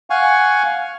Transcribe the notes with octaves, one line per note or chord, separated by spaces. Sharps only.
F5 F#5 G#5 C#6